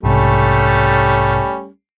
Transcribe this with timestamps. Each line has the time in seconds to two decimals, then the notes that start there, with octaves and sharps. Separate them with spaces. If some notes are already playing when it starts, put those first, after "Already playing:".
0.03 B1 G#2 C3 G3 A3 C#4